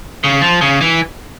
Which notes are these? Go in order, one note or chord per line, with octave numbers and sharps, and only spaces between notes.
C#3
F3
C#3
E3